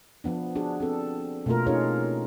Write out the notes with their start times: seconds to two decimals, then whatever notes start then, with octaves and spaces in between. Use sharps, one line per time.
0.24 F3 B3 D4
0.56 D4 F#4 G#4
0.80 C4 A4
1.46 B2 A3 A#3 F4 A#4
1.67 C#4 D#4 F4 G#4 A#4 C#5